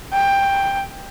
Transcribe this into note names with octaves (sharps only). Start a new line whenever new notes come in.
G5